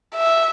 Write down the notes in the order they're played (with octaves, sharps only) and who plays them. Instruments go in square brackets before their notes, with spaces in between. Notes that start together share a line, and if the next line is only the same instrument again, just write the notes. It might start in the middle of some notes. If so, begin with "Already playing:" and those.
[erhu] E5